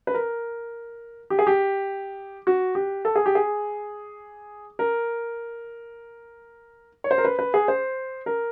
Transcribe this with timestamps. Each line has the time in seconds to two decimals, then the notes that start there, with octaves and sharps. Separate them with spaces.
0.07 B4
0.14 A#4
1.30 G4
1.39 G#4
1.47 G4
2.47 F#4
2.75 G4
3.05 A4
3.16 G#4
3.26 G4
3.35 G#4
4.79 A#4
7.04 C#5
7.11 C5
7.18 A#4
7.25 B4
7.39 B4
7.54 G#4
7.68 C5
8.26 A#4